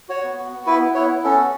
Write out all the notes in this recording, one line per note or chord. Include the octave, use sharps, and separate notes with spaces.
F#4 C#5
B3
F#4
B3
E4 B4
B3
E4 C#5
B3
C#4 A4
F#4